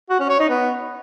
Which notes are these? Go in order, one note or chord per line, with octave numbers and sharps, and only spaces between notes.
F#4
C#4
C#5
D#4
B3